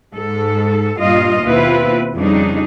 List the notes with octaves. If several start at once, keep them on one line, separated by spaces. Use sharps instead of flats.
G#2 A4
G2 A#2 F4 D#5 F5
D#2 B2 C4 E4 F4 B4
F2 C#3 G3 D4 D#4